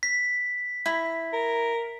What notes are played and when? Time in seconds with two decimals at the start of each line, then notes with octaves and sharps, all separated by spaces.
0.03 B6
0.86 E4 A#5
1.33 A#4